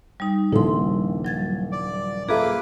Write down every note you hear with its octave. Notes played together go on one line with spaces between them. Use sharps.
G3 D#4
D#1 A#1 C#3 F3 E4 A4 C6
F#3 G#6 A6
D5
A#3 F4 G#4 A4 B4 E5 D6